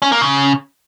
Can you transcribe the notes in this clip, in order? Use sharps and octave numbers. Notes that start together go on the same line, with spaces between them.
C#4
A#3
C#3